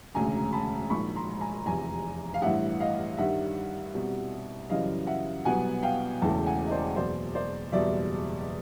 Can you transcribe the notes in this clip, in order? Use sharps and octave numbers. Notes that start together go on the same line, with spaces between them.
E1 D2 C#3 G#5 A#5
A5 B5
A#1 G#2 D#3 B5 C#6
A#5 C6
G#5 A#5
F1 E2 C3 G#5 A#5
F5
A1 G2 E3 E5 F#5
D#5 F5
G2 D#3 G3 E5 F#5
C2 B2 G3 C4
F#2 C#3 E3 G3 D#5 F5
E5 F#5
C2 B2 F#3 B3 F#5 G#5
F5 G5
E1 E2 C#3 E3 A3 G5 A5
F#5 G#5
D#5
C5 D5
F#1 E2 B2 C5 D5
C5 D5
F#1 E2 B2 G3 D5 E5